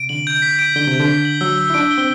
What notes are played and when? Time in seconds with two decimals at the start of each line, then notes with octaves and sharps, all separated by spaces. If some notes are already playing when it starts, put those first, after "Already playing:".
Already playing: C3 D7
0.09 D3 F#7
0.27 G6
0.42 B6
0.59 D7
0.76 D3 G7
0.88 C3 G6
1.00 D3
1.09 B6
1.25 F#7
1.41 F#3 E6
1.58 E6
1.70 E4
1.74 D4 D7
1.91 G7
1.98 C4